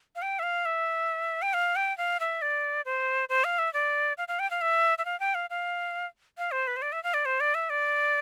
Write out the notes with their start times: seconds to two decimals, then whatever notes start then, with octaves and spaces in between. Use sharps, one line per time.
0.16 F5
0.22 G5
0.39 E5
0.43 F5
0.65 E5
1.42 G5
1.54 F5
1.76 G5
1.98 F5
2.20 E5
2.42 D5
2.85 C5
3.29 C5
3.44 F5
3.59 E5
3.74 D5
4.18 F5
4.28 F5
4.39 G5
4.51 F5
4.61 E5
4.98 E5
5.05 F5
5.20 G5
5.35 F5
5.50 F5
6.38 F5
6.52 C5
6.67 B4
6.76 C5
6.82 D5
6.92 E5
7.04 F5
7.14 D5
7.25 C5
7.40 D5
7.55 E5
7.70 D5